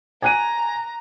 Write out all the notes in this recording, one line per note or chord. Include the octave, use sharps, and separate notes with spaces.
G#5 A#5 F#6 D#7